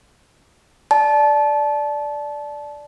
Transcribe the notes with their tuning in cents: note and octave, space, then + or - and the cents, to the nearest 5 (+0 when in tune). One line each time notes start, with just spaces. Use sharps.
D5 +0 A5 -20